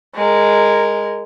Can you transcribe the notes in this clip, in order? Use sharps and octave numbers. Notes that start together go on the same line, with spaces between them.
G#3 A#4